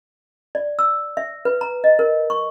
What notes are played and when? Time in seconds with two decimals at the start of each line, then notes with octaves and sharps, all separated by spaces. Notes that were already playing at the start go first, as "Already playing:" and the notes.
0.55 D5
0.79 E6
1.17 E5
1.45 B4
1.61 A#5
1.84 D#5
1.99 A#4
2.30 C#6